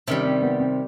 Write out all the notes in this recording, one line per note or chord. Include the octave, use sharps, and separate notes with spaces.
C3 D#3 G3 C#4
C4
B3
C4